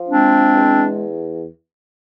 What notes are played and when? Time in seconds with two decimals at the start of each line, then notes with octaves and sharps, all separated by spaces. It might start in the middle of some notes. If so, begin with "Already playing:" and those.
Already playing: F3
0.09 G#3 C4 D4
0.53 E2